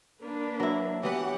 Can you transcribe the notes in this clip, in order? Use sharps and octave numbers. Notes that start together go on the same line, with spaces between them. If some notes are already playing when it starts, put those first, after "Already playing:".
A#3 D4 B4
F#3 E4
E3 F#3 B3 G4 B4 C#5 F#5